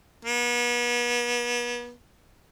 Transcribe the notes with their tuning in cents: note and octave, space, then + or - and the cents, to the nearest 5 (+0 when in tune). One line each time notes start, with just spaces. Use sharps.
B3 -40